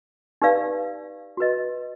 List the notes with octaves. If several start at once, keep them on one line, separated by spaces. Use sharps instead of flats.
D#4 G4 B4 D5 F5
F#4 B4 D#5